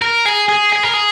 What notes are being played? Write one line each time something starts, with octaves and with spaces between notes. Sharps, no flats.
A#4
G#4
G#4
G#4
A#4
G#4